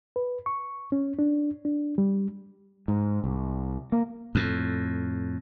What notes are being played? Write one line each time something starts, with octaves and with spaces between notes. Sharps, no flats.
B4
C#6
C#4
D4
D4
G3
G#2
C2
A#3
F2 A2